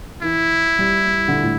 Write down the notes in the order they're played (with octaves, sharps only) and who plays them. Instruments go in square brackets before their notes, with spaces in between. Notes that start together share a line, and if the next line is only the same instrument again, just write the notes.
[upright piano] E3 [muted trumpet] E4
[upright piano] G3
G3
D3
A2